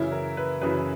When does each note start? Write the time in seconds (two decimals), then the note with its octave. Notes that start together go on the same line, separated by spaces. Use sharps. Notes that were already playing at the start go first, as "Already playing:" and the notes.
Already playing: F#2 C#3 E3 E4
0.12 A#4
0.37 B4
0.62 F#2 C#3 E3 B4